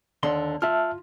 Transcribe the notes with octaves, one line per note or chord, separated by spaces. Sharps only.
D#2 D3 C6
F4 E5 A5 F6